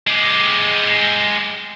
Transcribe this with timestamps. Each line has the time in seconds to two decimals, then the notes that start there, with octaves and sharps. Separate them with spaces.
0.07 G#3 G4